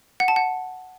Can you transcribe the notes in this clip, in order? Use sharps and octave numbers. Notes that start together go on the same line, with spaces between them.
F#5
A5
F#5